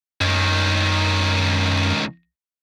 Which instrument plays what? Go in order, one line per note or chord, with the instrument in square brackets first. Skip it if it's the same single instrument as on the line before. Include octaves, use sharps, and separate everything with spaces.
[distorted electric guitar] C#2 D#3 [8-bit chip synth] F#2